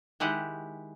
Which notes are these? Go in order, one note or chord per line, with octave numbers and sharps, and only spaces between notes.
D#3 G#3 E4 G4 F#5